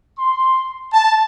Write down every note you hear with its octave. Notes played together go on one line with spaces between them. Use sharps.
C6
A5